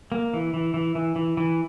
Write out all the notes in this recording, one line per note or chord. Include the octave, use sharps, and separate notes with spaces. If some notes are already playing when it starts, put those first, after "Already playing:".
A#3
E3
E3
E3
E3
E3
E3